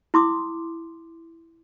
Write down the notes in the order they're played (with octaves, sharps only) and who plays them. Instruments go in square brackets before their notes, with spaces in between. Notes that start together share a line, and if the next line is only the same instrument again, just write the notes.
[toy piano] E4 C6 D6 D#6